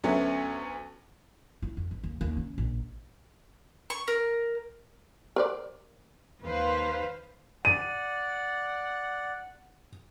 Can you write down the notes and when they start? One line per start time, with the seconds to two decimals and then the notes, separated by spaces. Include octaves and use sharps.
0.04 D2 F#3 A3 B3 C#4
1.62 E4
1.77 F2
1.91 G#1
2.04 D#2
2.21 D#2
2.37 C#4
2.58 A#1
3.90 C#6
4.08 A#4
5.36 A#4 C5 D5
6.42 D#2 D#3 B4 C5 F5
7.65 D5 F#5 D#7